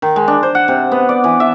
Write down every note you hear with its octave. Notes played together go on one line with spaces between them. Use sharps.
D#3
G#3
D4
C5
F#5
C3
B3
D5
E3
E5